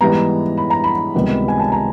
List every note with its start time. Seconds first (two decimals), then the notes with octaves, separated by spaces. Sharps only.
0.01 G#2 E3 G3 B3 A#5
0.57 B5
0.70 A#5
0.84 B5
1.14 C#2 C3 D#3 G3 B3
1.48 G#5
1.60 A5
1.72 A#5